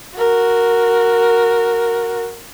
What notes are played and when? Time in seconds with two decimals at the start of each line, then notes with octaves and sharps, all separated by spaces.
0.18 F#4 A#4